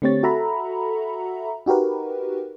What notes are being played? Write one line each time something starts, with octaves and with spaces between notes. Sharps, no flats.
D3 A3 C4 G4 C#5 A6
F#4 A4 E5 F#5 A#5 B5
D#4 F#4 G4 A#4 B4